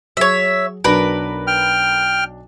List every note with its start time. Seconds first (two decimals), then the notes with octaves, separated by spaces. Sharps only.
0.17 F#3 G#4 C#5 E5
0.84 B1 F#3 D4 A#4 B4
1.47 G5 F6